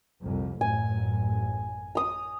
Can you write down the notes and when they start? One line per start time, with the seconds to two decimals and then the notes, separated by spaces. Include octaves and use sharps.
0.22 C2 F2
0.61 A1 F#2 G#5
1.95 A#5 D#6